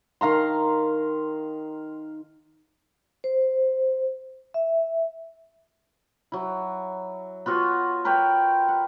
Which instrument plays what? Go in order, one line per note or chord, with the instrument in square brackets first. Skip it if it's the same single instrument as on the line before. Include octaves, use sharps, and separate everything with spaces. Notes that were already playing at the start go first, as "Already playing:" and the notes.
[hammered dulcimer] D#3 F5 A#5 C6
[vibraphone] C5
E5
[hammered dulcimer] F#3 E4
B3 F4 F#4 C#5
A#4 B4 C#5 G5
F#5